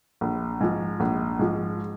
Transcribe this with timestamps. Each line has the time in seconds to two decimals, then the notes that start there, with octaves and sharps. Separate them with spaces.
0.21 A#1
0.61 G#2 F3
1.00 A#1
1.39 G#2 F3